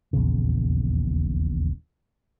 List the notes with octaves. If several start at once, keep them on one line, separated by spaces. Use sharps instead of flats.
D#1 A#1 E2 C#3